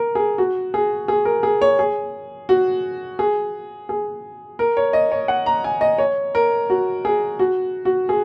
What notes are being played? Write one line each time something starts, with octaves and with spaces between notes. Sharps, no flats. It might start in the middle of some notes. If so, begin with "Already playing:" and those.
Already playing: A#4
G#4
F#4
G#4
G#4
A#4
G#4
C#5
G#4
F#4
G#4
G#4
A#4
C#5
D#5
C#5
F#5
A#5
G#5
D#5
C#5
A#4
F#4
G#4
F#4
F#4
G#4